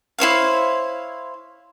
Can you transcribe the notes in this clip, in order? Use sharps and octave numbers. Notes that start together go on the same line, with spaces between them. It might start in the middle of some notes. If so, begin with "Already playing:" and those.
E4 C5 C#5 F5